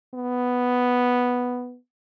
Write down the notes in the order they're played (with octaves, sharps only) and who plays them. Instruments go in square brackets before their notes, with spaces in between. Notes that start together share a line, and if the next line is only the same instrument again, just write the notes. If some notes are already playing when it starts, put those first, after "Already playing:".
[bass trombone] B3